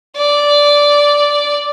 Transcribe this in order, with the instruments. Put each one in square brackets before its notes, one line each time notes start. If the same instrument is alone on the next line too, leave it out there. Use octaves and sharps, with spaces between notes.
[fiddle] D5